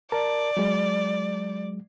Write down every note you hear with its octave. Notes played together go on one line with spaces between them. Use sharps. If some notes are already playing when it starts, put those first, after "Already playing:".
A#4 D5 A5
F#3 G#3